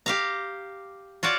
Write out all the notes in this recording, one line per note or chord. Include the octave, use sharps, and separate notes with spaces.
G4 F5 A#5
F4 F#4 C#5 D5